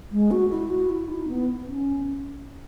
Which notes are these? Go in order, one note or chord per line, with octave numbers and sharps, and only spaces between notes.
G#3
F#4
E4
F#4
E4
D#4
B3
C#4